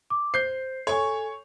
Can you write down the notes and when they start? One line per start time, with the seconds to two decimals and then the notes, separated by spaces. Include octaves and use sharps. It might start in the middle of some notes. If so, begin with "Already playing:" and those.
0.10 D6
0.34 C5 G6 C7
0.87 A4 C#5 G#5 C#6